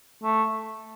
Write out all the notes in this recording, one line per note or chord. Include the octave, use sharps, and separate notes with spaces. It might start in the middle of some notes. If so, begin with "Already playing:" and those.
A3